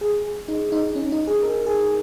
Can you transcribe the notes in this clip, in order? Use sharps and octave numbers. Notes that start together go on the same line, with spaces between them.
G#4
D#4
D#4
C#4
D#4
G#4
A#4
G#4